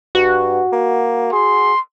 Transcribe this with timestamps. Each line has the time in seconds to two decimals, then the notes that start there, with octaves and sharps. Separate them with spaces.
0.15 G2 F#4
0.72 A#3
1.33 G#4 C6